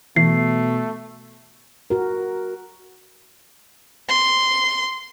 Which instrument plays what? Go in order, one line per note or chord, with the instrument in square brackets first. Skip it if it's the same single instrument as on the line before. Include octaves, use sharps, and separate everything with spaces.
[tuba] B2 [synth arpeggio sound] E3 [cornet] A3 [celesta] C7
[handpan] F#4 A#4
[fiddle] C6